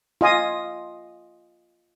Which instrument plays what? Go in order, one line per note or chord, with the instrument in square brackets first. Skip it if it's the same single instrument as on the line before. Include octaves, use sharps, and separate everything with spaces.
[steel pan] F4 D#5 G#5 D#6